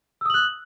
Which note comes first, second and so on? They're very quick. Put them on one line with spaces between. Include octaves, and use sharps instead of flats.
E6 D#6 F#7 F#6